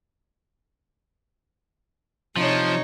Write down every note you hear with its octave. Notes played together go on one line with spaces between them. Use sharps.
C3 F3 D#4 C#5